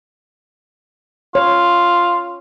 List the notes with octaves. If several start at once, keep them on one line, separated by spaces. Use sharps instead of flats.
F4 C#5